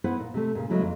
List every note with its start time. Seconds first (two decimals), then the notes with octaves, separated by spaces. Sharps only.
0.04 B3 E4 B4 C5 F#5
0.19 A#2
0.34 C3 A3
0.55 A#2 C#3
0.70 C#3 F#3 G#3 A3 E4
0.82 F2